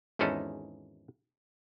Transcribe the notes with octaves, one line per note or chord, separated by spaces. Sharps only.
G#1 E2 G#3 C#4 D#4 A4